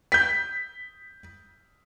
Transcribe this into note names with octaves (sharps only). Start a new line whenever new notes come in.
G6 B6